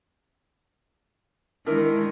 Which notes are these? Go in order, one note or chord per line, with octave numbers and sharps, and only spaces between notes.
D#3 G#3 D4 E4 A#4